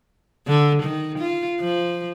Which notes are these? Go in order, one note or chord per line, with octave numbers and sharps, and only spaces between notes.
D3
D#3
F4
F3